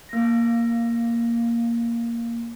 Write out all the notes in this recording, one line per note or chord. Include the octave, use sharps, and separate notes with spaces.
A#3 A#6